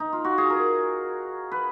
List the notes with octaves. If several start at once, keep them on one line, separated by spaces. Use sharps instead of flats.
D#4
F4
F#4
G#4
A#4
B4